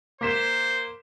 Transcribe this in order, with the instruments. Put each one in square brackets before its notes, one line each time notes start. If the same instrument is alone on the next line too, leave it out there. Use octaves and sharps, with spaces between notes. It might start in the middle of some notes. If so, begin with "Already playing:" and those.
[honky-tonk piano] A#3 B6 E7 [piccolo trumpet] C5